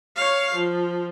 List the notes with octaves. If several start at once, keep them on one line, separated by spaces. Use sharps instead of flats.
C#5 F5
F3